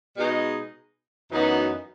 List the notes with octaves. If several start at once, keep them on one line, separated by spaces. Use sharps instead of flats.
B2 G#3 D#4 G#4 D#5
F#2 E3 B3 D#4 F#4